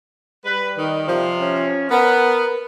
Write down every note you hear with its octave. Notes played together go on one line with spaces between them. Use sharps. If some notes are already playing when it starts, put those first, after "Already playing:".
G3 B4
D#3
C3 F3
C#4
B3 A#4